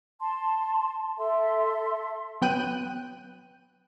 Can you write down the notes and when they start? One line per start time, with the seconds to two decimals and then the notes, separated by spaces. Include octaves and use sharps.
0.20 A5 C6
1.18 A4 E5 C6
2.42 F#3 B3 G5 F#6 D#7